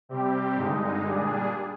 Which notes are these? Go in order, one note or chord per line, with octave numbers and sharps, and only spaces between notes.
C3 G3 C4 G4
G2 D3 G#3 D#4
A#2 G3 D4 G#4